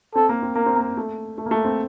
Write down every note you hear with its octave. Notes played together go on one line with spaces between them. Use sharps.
C4 A4
A#3
C4
A#3 A#4
C4
A#3
A3
A3
A#3
A3
C4